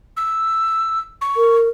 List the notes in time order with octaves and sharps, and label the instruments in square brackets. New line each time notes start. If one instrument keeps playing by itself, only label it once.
[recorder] E6
C#6
[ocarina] A#4